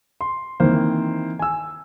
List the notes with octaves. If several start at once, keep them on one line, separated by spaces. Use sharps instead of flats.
C6
D#3 E3 A#3 C4 C5
G#5 E6